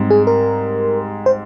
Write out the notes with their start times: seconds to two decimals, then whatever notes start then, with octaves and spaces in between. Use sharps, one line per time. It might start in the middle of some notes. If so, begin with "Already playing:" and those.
Already playing: G#2 G3 C4
0.11 G#4
0.27 A#4
1.26 C5